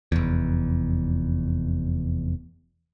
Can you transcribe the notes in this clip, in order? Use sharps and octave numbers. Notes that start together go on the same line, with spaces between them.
F1 E2